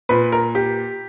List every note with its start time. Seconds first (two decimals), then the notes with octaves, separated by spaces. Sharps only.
0.09 A#2 B4
0.32 A#4
0.55 G4